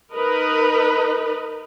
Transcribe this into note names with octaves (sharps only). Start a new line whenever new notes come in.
D#4 A#4 B4 D#5